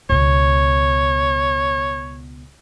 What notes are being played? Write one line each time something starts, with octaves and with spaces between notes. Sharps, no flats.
C#2 B2 C#5